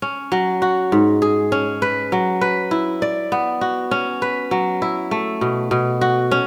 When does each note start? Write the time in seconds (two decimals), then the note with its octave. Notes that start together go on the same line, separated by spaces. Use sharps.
0.02 C#4
0.32 F#3
0.62 F#4
0.92 G#2
1.22 G#4
1.52 C#4
1.82 B4
2.12 F#3
2.41 B4
2.71 E4
3.02 D5
3.32 B3
3.61 F#4
3.91 C#4
4.22 B4
4.51 F#3
4.82 E4
5.11 A3
5.41 B2
5.71 B2
6.01 F#4
6.31 C#4